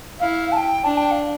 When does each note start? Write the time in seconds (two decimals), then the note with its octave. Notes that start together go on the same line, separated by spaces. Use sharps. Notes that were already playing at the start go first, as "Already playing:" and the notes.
0.20 E4 F5
0.52 A5
0.57 G5
0.84 D4 A5
0.97 G5
1.11 F5